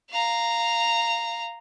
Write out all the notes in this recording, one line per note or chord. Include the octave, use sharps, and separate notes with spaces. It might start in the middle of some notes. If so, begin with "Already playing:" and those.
F5 A#5